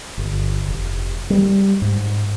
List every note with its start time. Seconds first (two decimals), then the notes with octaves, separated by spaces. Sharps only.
0.18 G1
0.68 F1
1.30 G3
1.82 G#2